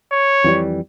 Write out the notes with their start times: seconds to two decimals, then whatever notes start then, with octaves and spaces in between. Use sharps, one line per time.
0.12 C#5
0.44 F2 E3 G3